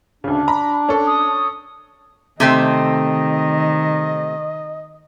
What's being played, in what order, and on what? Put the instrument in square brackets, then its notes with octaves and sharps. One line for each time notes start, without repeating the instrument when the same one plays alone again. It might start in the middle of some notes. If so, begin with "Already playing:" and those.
[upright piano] D2 C#3 [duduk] D4
[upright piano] A#5 B5
C#4 A4
[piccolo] D#6
[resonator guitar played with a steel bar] C3 A3 C4 [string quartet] D#3 [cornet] D#5